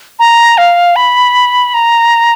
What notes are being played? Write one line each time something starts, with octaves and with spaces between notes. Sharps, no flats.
A#5
F5
B5
A#5